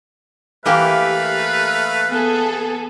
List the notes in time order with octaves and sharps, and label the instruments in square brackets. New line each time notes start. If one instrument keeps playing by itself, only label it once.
[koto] E3 A#3 G4 [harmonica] A3 F5 [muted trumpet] B4
[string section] B3 G#4 A4